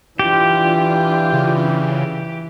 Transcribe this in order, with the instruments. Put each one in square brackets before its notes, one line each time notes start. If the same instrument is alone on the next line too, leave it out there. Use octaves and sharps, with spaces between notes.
[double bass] E3 [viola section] D4 F4 [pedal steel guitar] G4
[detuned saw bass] C#3